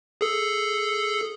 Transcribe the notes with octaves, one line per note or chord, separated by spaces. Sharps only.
G#4 A4